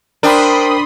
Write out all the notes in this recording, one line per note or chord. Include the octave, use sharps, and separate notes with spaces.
D4 A#4 C5 G5 B5 C6 D#6